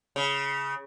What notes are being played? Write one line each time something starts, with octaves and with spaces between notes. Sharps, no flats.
C#3